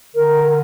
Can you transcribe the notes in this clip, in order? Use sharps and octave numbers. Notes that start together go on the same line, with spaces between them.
D3 A#4
A#4